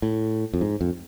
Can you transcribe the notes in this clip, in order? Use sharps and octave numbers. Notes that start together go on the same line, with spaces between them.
A2
F2
G#2
F2